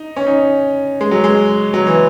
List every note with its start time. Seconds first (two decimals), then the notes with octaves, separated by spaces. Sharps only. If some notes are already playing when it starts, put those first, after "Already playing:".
Already playing: D#4
0.16 C#4
0.27 D#4
1.01 G#3
1.11 F#3
1.24 G#3
1.74 F#3
1.87 E3